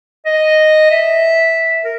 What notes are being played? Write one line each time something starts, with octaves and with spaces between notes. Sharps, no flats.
D#5
E5
A#4